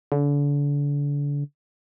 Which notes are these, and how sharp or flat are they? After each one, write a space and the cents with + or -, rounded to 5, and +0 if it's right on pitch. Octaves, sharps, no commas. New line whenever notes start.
D3 -35